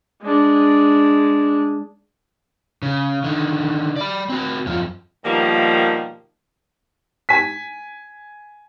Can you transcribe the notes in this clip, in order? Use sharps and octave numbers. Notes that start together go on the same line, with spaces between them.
G#3 D4
C#3
D3 D#3
D5 B5
C4 F#4
F#2 F3
B2 D#3 F3 G3 A#3
G#5 B6